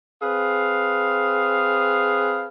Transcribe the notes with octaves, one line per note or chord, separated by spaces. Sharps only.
C4 G#4 B4 F5